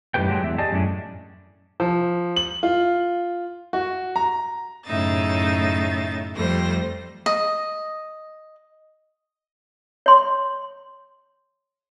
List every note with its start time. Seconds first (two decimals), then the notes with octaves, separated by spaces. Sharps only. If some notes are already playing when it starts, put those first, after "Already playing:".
0.14 F#2 A2 D#3 G4 B4 G5
0.28 F#3 G#3 D4 F#4 G4
0.43 E2 E5
0.58 G4 G#4 D5 D#5 A5
0.72 F#2 A2 C#4 D4
1.80 F3
2.36 F#7
2.63 F4
3.73 F#4
4.16 A#5
4.86 F#2 A2 C#3 D#4 E5 A6
6.34 F2 F3 G3 A3 C5 A#6
7.26 D#5
10.06 C#5 C6